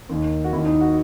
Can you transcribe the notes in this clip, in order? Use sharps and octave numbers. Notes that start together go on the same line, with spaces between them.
D#2 D#3
F#4
D#2 D#3 E4
D#4
F#4